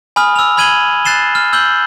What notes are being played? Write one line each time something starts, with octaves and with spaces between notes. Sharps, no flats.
G#5 B5 D#6 F6
E6 F7
B5 F6 G#6 D#7 F#7 G7
F#6 A6 C7 E7 G7
F6
E6 G6 F#7 G7